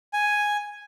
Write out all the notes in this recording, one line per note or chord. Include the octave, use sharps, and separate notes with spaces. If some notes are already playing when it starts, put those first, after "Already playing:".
G#5